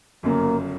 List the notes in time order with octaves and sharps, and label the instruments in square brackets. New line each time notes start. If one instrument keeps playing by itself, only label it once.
[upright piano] G1 F#2 C#3 [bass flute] A#3